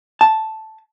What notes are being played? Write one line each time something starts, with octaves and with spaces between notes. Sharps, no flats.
A5